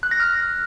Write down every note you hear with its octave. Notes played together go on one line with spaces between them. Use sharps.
F#6
A#6
F6